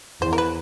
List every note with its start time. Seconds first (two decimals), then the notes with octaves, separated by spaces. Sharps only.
0.22 E2 C5
0.33 A#4
0.38 B4